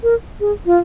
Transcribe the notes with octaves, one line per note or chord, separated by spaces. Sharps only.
A#4
G#4
F4